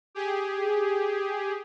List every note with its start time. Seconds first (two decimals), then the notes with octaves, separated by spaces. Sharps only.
0.15 G4 G#4